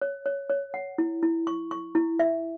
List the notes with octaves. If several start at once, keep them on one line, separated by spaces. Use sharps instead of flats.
C#5
C#5
C#5
F#5
E4
E4
C#6
C#6
E4
E5